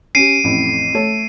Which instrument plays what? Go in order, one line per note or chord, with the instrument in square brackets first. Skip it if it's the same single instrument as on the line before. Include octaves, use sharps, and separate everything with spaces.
[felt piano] C#4 G4 [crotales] C7 D7 D#7
[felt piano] A1 F2 A2
A3 A4 C#5